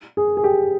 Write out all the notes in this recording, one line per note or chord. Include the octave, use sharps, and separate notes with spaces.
G#4
G#4
G4